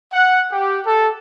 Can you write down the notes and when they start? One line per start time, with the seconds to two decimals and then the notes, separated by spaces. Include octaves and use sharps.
0.13 F#5
0.52 G4
0.86 A4